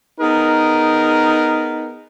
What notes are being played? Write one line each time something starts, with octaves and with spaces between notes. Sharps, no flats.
B3 D#4 G#4 A#4